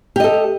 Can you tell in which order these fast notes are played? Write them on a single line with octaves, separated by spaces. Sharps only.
G4 D#5 A4